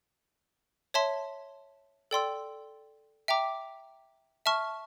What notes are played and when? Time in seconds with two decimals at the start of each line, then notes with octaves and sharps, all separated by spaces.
0.94 C#5 E5 A5 C6
2.11 A4 D5 G5 C6 E6
3.28 E5 G5 A#5 D6
4.46 E5 A5 C#6 F6